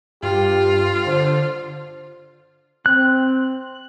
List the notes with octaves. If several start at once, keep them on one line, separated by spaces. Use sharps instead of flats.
G2 F4 G4
D3 C5
C4 F#6